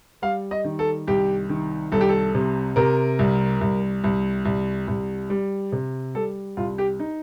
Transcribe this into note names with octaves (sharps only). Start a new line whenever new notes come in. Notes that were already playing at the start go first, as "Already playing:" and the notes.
G3 F5
D#5
D#3
A4
C2 G4
D#3
C2 A4
G4
A4
C3
C3 A#4
C2
C2
C2
C2
C2
G3
C3
G3 A4
C2 F4
G4
D#4